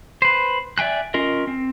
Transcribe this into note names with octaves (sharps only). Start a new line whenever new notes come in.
B4 C5
D5 E5 G5 G#5 F#6
C#4 F4 A#4 D#5
C4